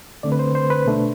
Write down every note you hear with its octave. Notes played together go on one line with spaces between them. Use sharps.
D3 A3 C4 D5
B4
C5
C5
B4
B2 A3 D4